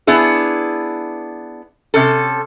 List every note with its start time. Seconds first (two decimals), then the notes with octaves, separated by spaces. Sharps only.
0.07 B3 D4 E4 G#4
1.94 C3 C#4 A4